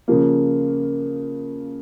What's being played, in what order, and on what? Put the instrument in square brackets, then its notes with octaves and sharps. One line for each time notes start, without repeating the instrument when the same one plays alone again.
[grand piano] C#3 F3 A#3